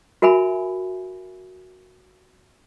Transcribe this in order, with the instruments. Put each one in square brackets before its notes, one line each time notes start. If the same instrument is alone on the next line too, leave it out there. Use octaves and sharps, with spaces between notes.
[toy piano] F#4 A#4 E5 G#5 B5